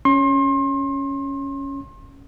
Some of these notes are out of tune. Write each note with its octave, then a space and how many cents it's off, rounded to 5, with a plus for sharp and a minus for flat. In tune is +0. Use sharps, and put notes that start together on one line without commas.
C#4 +0 C6 +35